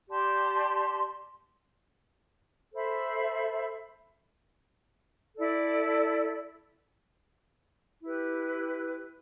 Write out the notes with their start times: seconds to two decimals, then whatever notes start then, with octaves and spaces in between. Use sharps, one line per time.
0.08 G4 D5 A5 C6
2.73 A4 C5 E5 B5
5.38 E4 A4 D5
8.02 E4 G4 B4